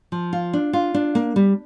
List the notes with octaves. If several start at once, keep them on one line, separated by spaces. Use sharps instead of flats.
F3
F4
D4
F4
D4
A#3
G3